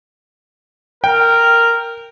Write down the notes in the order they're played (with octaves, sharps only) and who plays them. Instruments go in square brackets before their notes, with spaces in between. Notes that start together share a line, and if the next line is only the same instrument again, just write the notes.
[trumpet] A#4 [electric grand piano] G5